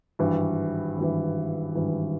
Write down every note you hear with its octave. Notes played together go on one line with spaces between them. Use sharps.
G#1 G2 E3
G#1 G2 E3
G#1 G2 E3